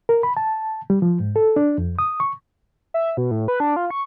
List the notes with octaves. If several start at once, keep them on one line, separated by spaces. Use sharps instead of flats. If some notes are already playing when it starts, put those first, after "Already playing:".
A#4
B5
A5
G3
F3
G#2
A4
D4
F2
D#6
C#6
E5
B2
A2
B4
D4
F4
C#6